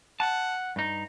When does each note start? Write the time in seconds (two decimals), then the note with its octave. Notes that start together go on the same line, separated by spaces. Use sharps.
0.20 F#5 A5
0.76 G2 D#4